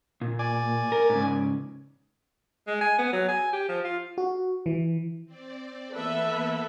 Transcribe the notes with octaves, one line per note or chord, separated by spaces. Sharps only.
A#2
D5 G#5
A#4
G#2 C#3
G#3
G#5
B3
F#3
G#5
G4
F3
F4
F#4
E3
C4 D5
E3 A#3 B3 A4 B4 E5